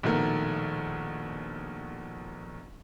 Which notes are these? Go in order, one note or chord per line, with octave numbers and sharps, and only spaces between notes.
A#1 B2 D#3 A3 A#4